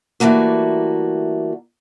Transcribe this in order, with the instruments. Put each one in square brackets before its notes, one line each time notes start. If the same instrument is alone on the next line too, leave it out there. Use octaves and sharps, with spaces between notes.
[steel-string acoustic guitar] E3 G3 A3 A#3 F#4